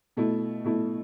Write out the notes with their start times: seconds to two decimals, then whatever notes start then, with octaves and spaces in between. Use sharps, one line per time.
0.17 B2 A3 E4
0.64 B2 A3 E4